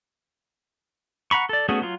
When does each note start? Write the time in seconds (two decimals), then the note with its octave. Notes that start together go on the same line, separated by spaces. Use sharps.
1.31 F#5 A#5 B5 C#6
1.49 A4 D5
1.69 A3 B3 C#4 F#4 G#4
1.82 F#3 F4